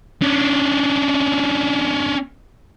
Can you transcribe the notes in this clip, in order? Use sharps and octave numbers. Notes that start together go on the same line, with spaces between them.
C#4 D4